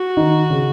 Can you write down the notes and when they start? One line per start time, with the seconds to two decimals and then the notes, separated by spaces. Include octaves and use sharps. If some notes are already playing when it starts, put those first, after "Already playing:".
Already playing: F#4
0.17 D#3
0.50 C#3